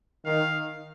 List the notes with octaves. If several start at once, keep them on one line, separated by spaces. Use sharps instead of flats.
D#3 F5